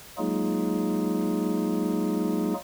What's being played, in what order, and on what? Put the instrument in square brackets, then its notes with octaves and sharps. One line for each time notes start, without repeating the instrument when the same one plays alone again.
[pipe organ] F#3 G#3 A#3 D#4 F4 G#4